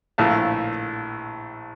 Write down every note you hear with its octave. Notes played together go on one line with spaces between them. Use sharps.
A#1 A2 A3 F5 A5